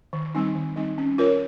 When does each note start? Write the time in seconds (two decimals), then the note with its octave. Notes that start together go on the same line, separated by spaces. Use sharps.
0.13 D#3
0.35 G3 C4 D#4
0.55 D#3
0.76 G3 C4 D#4
0.98 C#4
1.18 F4 A#4 C#5